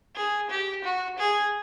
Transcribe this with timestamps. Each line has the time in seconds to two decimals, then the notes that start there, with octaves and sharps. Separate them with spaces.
0.15 G#4
0.50 G4
0.84 F#4
1.19 G#4